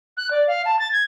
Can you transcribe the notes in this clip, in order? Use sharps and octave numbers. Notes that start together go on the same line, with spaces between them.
F#6
D5
F5
A5
A6
G#6